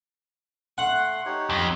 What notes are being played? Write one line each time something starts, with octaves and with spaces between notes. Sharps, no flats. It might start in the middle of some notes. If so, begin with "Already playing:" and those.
A3 F#5 C6
D#4 G4 C#5
F2